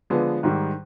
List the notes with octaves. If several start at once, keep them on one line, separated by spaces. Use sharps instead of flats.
D3 F3 G#3 B3
G#2 D#3 G3